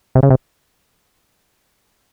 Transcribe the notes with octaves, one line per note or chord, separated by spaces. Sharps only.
C3
C#3
C3